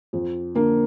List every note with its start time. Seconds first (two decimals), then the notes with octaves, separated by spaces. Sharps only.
0.13 F2
0.55 D3 A#3